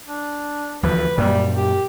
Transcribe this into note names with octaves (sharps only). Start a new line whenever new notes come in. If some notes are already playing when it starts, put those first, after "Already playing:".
D4
D2 E3 F3 B4
F#2 A#2 G3
G4